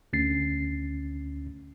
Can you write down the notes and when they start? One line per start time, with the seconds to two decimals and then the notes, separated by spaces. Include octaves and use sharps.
0.13 D2 C#4 A6 C7